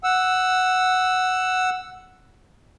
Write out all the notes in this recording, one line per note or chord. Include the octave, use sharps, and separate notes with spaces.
F#5 E6